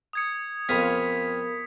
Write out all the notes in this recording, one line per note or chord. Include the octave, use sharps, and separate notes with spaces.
D#6 G#6 C#7
F2 B3 G#4 A#4 F5 B5 B6